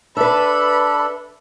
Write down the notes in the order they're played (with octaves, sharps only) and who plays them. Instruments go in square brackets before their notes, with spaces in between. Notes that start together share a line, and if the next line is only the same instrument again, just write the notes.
[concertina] D4 A4 [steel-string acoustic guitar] B4 E5 [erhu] B5